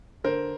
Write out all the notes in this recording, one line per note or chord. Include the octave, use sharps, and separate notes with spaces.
D3 A#4 C5